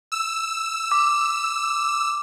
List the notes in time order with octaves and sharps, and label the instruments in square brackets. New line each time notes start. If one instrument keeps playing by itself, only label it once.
[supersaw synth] E6
[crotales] D6